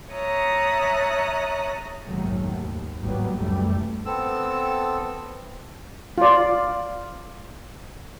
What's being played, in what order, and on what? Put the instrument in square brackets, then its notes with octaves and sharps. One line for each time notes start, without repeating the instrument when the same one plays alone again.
[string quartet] C#5 E5 A5 A#5 D#6 F#6
[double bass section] F1 A#1 G#2 D#3 F#3 A3
D#2
G#1 A2 F#3 G3 A#3 B3
F1 C#2 F#2 E3 G3 A3
[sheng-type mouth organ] B3 C4 A4 E6
[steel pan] F4 D5